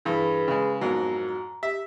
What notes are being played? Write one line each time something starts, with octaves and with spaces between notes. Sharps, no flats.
G2 E3 G#4 B4 B5
C#3 G#3
F2 G#2 F#3 B3 A#4 A#5
A#5
G4 E5